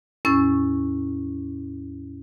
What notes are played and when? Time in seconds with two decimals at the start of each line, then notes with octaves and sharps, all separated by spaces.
0.25 E2 A2 C#4 E6 A6